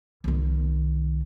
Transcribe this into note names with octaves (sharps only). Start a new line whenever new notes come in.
C2 D#3